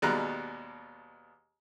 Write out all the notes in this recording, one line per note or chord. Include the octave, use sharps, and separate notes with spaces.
D#2 B2 G3 G#3 A#5 F#6